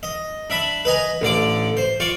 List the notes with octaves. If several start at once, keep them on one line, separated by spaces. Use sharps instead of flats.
D#5
D4 E5 B5
B4 D#5 G#5 A#5
A1 D3 D5 D6
C5
F4 D5 C#6